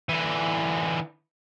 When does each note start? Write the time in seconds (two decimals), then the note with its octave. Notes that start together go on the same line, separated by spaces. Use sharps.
0.09 D3 E3